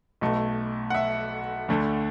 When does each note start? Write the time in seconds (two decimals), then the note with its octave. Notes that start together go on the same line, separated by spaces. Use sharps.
0.21 B1 B2 A3
0.90 F#5
0.95 E5
1.68 D2 D3 A3